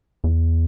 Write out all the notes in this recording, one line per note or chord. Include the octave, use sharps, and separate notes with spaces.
E2